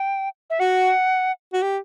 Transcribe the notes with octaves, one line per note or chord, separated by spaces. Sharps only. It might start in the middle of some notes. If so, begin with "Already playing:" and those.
Already playing: G5
E5
F#4 F#5
F#4
G4